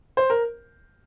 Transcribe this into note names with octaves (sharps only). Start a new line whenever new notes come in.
C5
A#4